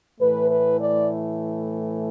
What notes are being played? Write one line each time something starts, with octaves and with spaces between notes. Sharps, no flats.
A2 E3 A3 B4
B4
D5